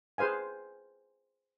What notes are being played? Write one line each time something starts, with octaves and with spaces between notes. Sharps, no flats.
G#4 B4 C5 F5 G#5